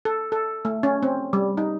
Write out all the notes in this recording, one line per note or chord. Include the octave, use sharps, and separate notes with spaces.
A4
A4
A3
C#4
C4
G3
D#4